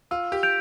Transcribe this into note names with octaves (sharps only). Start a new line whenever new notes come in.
F4 E6
G4
G6 D7 F7